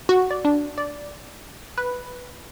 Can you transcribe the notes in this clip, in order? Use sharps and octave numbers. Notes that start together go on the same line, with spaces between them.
F#4
D5
D4
D5
B4